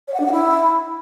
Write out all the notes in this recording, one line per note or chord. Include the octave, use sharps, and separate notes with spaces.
C#5
F#5
D4
F#5
E4